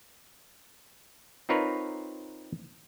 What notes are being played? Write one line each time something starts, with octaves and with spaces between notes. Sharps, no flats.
C4 D#4 F4 A#4 B4 C#5